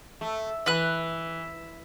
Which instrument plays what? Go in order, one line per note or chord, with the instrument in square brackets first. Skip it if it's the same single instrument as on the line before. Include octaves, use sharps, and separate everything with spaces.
[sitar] A3
[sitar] E3 [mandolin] B4 F#6